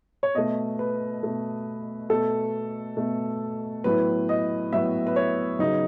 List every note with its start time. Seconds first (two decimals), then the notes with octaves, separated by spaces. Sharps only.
0.23 C#5
0.35 B2 A3 D#5
0.79 B4
1.23 B2 A3
2.09 B2 A3 A4
2.97 B2 A3
3.84 A2 F#3 B3 B4
4.29 D#5
4.72 A2 F#3 B3 E5
5.07 B4
5.16 C#5
5.59 C#3 F#3 B3 D#4